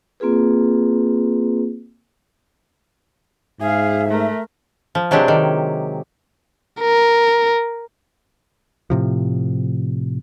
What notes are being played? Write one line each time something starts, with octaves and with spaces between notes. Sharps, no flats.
A#3 C4 F4 G#4 B4
G#2 G#4 E5 F5
A3 A#4
F3
C3 F#3 G#3 D4 G4
D#3
A#4
A2 C3 F3